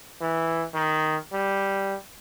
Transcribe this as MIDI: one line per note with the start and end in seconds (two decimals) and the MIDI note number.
0.21 0.64 52
0.74 1.16 51
1.33 1.96 55